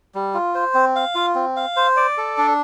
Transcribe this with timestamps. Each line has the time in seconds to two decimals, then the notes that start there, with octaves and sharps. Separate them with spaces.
0.15 G3
0.34 F4
0.55 C5
0.74 C4
0.96 F5
1.15 F4
1.35 C4
1.56 F5
1.76 C5
1.97 D5
2.18 A4
2.38 D4